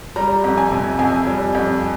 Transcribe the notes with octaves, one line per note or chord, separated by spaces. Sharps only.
G3 A#5
F2
G#5
C3
F2 G#5
G3
F2